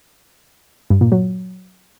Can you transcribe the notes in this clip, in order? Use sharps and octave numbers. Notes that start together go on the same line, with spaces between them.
G2
A#2
F#3